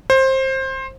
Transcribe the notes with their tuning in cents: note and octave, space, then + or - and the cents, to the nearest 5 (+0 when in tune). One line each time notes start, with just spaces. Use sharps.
C5 +20